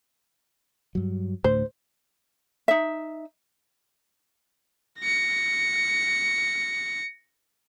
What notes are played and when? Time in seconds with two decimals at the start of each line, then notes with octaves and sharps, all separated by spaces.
0.95 G2 F#3
1.44 D2 A2 C5
2.68 D#4 E5
4.99 A#6 C#7